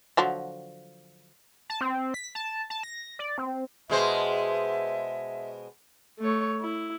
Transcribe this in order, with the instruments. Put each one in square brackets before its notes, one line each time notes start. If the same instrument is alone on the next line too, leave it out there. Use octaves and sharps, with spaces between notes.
[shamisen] D3 F3 F#3
[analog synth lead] A5
C4
B6
A5
A5
A#6
D5
C4
[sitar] B2 G#3 C5 [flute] E5
[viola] A3 C#5
E4